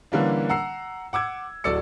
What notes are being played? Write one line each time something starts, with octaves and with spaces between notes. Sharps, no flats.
D3 E3 G3 A#3 C#4 D4
F#5 A#5 E6 C7
F#5 D6 E6 G#6
D1 F#4 A4 D5 E6 C#7